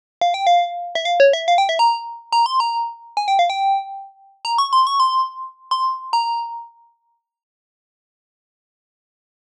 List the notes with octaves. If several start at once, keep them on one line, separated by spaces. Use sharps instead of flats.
F5
G5
F5
E5
F5
C#5
E5
F5
G5
E5
A#5
A#5
C6
A#5
G#5
G5
F5
G5
A#5
C#6
C6
C#6
C6
C6
A#5